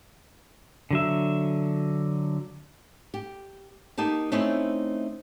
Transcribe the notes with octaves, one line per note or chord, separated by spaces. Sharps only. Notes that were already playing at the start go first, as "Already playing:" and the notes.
D3 F#3 E5
G4
A#3 D#4 G4 A5
A3 C4 C#4 D#4 E4